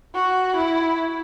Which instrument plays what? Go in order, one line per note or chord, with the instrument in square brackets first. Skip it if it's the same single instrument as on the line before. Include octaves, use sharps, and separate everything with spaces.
[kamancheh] F#4
E4